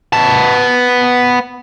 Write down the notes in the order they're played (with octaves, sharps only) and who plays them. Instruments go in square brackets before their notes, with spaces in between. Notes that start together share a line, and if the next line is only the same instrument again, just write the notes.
[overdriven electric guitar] B3 A5